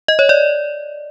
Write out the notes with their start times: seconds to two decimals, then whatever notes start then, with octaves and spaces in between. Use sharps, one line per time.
0.08 D#5
0.19 C#5
0.29 D5